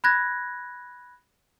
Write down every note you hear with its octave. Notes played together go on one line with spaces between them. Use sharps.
B5 F#6 G#6 A#6